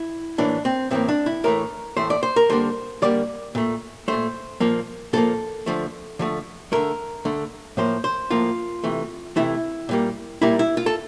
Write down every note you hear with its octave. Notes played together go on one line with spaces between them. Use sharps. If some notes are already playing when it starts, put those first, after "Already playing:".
Already playing: E4
A2 E3 A#3 D4
C4
A2 E3 A#3 C4
D4
E4
A2 E3 A3 A#4
A2 E3 A3 C5
D5
C5
A#4
D3 G3 A#3 C5
D3 G3 A#3 D5
A#2 A3
A#2 A3 C5
A#2 F3 A#3
A#2 F3 A#3 A4
D3 F3 A3
D3 F3 A3
D3 A3 A#4
D3 A3
A2 F3 A#3 C5
C5
A2 F3 A#3 F4
C3 E3 A3
C3 E3 A3 E4
A#2 G3 A#3
A#2 G3 A#3 E4
E4
F4
A4